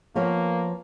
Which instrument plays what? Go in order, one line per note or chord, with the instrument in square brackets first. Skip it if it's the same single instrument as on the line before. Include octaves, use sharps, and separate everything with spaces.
[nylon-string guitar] F3 B3 C#5 [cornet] A#3